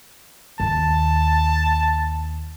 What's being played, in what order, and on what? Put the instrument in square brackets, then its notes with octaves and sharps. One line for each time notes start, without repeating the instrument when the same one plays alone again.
[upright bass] D#2 [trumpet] A5